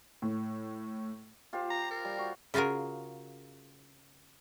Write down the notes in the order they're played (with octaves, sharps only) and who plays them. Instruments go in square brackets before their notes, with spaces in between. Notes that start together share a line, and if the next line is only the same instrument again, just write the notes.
[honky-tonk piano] A2
[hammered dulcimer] F4 G4 C5
[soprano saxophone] A#5
A#4
[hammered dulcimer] G3
F#4
[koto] C#3 F4 F#4 G#4 A#4